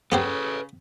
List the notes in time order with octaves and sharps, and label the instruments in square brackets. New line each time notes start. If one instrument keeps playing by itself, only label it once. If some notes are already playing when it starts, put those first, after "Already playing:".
[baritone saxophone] C#3 [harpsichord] B3 G4 C5 [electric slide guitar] A4 B4